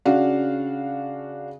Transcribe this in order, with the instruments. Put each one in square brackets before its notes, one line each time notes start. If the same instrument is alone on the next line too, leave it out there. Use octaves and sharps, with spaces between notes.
[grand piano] C#3 [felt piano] D4 F#4 F5